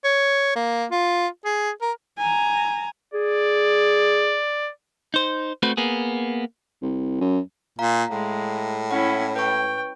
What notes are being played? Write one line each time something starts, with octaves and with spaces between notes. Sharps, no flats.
C#5
A#3
F4
G#4
A#4
G#5 A#5
G#4 D5
D#4 C5
A3 C4 F#4 B4
A#3 B3 G#4
C2
F#2
A#2 F5 A#5
A2 G#3
C#4 E4 F#5
B4 G5 C#6